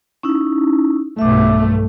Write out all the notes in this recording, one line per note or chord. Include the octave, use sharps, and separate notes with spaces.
C#4 D#4 E4
B1 G2 A3 E5 D6